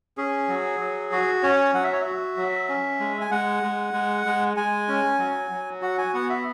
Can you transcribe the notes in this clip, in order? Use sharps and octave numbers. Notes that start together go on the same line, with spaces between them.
C#4 G#4
F#3
F#3
F#4
C#4 C#5
F#3 F#5
E5
C#5
F#4 E5
F#3
C#4
G#3
G#5
G#3 F#5
G#3
G#3
G#3
G#3 G#5
C#4
F#3
F#3
F#4 F#5
G#5
B3 F#5
E5